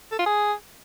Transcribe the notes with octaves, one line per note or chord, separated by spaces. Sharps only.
A4
F4
G#4